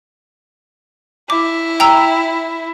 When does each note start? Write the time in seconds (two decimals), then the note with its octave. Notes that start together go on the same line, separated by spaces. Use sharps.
1.30 E4 D6
1.80 G5 A#5 E6